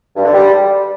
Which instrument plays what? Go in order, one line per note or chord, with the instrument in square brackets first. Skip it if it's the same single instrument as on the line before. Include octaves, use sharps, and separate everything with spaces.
[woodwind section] G2
D3
G3